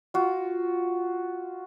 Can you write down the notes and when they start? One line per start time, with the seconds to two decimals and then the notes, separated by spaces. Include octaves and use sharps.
0.14 F4 F#4